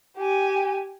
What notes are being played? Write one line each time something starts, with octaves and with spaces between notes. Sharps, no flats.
G4 G#5